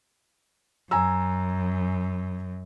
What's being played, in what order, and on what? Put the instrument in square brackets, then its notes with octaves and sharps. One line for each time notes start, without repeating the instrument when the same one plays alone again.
[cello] F#2 [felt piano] G#5 A#5 E6